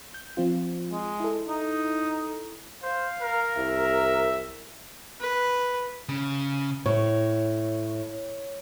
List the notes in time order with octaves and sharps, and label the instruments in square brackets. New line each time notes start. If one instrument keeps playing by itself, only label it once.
[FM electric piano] G6
F3 C4 F4
[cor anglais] G#3
[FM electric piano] E4 A4
[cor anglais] D#4
[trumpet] C5 [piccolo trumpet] F5
[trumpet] A#4
[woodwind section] C2 [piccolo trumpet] E5
[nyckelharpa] B4
[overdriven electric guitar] C#3
[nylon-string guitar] A2 [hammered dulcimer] C#5